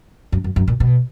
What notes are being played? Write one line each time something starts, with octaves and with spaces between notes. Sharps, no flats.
F#2
F#2
F#2
A#2
B2